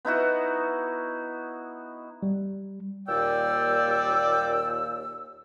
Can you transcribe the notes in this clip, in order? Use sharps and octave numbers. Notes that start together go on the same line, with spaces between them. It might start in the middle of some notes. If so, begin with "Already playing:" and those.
B3 D#4 E4 F#4
G3
D#2 A#2 D5 G5 E6